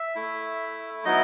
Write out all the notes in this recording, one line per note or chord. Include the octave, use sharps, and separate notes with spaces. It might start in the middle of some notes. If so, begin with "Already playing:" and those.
Already playing: E5
A3 E4
F#3 B3 D#4 E4 D#5